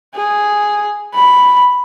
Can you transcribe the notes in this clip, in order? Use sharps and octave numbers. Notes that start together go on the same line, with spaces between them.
G#4
B5